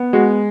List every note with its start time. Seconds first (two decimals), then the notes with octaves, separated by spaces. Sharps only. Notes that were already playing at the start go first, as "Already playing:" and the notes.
Already playing: B3
0.13 G#3 F#4